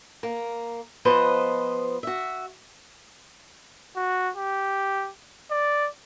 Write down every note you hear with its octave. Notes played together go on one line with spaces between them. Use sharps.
A#3
F3 B3 B4 C5 D#5
F#4 E5
F#4
G4
D5